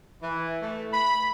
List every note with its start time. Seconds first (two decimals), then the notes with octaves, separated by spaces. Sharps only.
0.22 E3
0.63 A3
0.93 B5